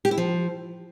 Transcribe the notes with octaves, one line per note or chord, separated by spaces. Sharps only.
G4
E4
F3